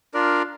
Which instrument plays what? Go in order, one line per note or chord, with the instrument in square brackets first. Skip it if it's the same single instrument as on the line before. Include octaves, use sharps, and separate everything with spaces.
[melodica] D4 F4 A#4 D5